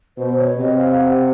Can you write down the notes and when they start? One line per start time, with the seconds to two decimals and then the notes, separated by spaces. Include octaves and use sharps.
0.18 B2 C5
0.38 C#5
0.57 C3 D#5
0.77 F5
0.98 F#5